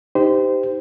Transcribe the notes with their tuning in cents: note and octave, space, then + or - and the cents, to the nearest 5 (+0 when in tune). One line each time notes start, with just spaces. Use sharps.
D#4 +5 G4 +0 C5 -25